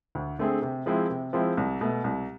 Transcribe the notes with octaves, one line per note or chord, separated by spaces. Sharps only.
D2
D3 A3 C4 G#4
C3
F3 G#3 C4 E4
C3
F3 G#3 C4 E4
C2
B2 A3
C2